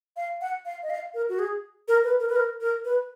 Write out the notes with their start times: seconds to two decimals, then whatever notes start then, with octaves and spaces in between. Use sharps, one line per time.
0.17 F5
0.41 F#5
0.65 F5
0.83 D#5
0.90 F5
1.14 A#4
1.29 F#4
1.39 G#4
1.88 A#4
2.03 B4
2.20 A#4
2.29 B4
2.36 A#4
2.61 A#4
2.85 B4